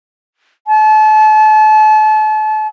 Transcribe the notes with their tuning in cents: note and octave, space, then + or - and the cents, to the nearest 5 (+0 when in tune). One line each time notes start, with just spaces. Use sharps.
A5 -35